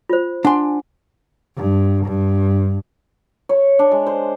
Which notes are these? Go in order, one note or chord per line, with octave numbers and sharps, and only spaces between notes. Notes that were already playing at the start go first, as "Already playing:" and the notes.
F4 C5
D4 F#5 G#5 C6
G2
G2
C#5
D4
G#3
C5